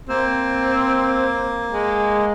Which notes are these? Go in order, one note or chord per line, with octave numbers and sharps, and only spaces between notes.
A#3 C4
G#3